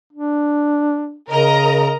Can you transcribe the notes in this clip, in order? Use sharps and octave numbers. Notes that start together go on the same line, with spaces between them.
D4
C#3 A#4 D#5 A#5